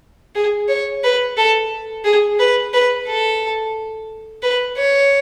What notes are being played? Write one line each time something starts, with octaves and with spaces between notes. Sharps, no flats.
G#4
C#5
B4
A4
G#4
B4
B4
A4
B4
C#5